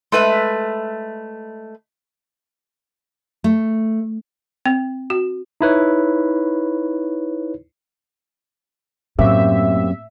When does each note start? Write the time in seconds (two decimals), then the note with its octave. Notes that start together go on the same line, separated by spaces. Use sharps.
0.12 G#3 A3 B4 E5
3.44 A3
4.66 C4
5.10 F#4
5.61 D#4 E4 B4 C#5
9.19 F#2 A2 A#3 C4 G4 E5